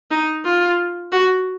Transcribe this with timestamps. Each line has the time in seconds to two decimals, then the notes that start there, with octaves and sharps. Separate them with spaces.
0.11 D#4
0.45 F4
1.12 F#4